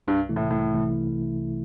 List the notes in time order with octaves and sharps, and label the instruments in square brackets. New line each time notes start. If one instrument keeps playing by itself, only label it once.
[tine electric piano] C2 [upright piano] G2
[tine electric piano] C3 E3 A3 E4
[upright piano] A2
[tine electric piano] C2 [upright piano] A2
[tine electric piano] C3 E3 A3 E4